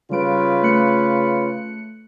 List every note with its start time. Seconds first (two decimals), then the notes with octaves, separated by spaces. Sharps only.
0.11 C#3 G3 F4 B4 D7
0.63 A3 F#6 C#7